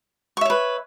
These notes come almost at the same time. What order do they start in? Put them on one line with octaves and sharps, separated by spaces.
C#6 E5 C#5 B4